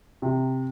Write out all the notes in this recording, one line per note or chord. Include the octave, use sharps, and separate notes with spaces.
C3